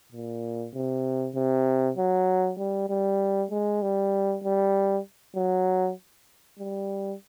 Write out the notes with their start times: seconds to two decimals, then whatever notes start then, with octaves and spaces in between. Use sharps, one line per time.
0.12 A#2
0.74 C3
1.35 C3
1.97 F#3
2.59 G3
2.89 G3
3.51 G#3
3.82 G3
4.44 G3
5.36 F#3
6.59 G3